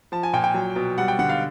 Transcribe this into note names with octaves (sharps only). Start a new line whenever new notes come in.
F3 A5
G#5
A#2 G5
G5
F#3
B2
G3 F#5
G5
D3 F#5
F5